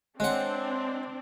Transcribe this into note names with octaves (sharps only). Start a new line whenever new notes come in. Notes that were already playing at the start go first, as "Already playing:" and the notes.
G#3 C4 D4 C#5 F#5 C6 F#6